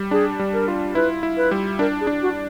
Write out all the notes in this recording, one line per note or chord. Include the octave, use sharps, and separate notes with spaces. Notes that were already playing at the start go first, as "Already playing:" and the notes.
Already playing: G3
D4 G#4
G3
A#4
F4
E4 B4
E4
B4
G3
D4 A#4
G#4
D4
F#4